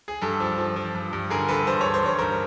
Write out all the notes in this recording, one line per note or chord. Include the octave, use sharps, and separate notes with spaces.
G#4
G2 A4
F3
F3
F3
G2
G2
D3 G#4 A#4
G2 A4 B4
G2 C5
G2 C#5
C5
G2 C#5
G2 A#4 C5